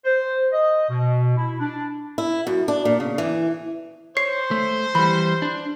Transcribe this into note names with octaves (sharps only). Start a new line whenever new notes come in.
C5
D#5
B2
E4
D4
E4
F#2
D4
A#2
C#3
E3
C5 C#5 C7
A3
E3 G3 B5
D4